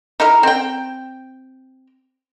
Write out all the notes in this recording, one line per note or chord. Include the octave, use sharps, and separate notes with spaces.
D#4 E4 A#4
C4 G5